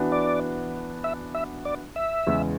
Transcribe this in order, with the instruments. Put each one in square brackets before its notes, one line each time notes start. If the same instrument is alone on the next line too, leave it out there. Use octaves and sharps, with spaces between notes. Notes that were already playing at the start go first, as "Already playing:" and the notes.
Already playing: [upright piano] E3 B3 D4 F#4
[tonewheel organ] D5
E5
E5
D5
E5
[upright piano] E2 C#3 G#3